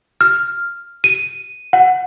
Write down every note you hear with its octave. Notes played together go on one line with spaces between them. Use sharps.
F6
D#7
F#5